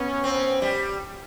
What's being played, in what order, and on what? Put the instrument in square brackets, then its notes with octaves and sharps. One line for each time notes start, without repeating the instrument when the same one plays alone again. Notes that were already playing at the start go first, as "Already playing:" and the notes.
Already playing: [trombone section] B3 C#4
[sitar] C4
G3